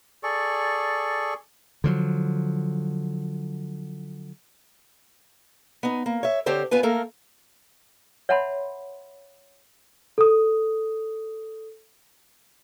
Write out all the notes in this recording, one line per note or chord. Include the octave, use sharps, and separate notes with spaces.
G#4 A4 D5 C#6
D3 F3 F#3
B3 D#4
A#3
C#5 E5
D3 C4 G4 C5 C#5
D2 B3 F4 B4 G#5
A3 A#3 A4 A#4
C#5 E5 F#5 A5 B5 C6
A4 D#6